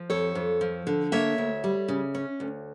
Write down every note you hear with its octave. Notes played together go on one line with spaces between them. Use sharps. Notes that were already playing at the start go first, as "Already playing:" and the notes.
Already playing: F3
F2 A4 C#5
F2
F3
D3
A#3 C#5 E5
D2
G3
C#3
C#4
D2